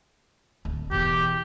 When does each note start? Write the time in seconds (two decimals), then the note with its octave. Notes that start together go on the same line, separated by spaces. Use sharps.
0.65 D1
0.91 E2 B2 G4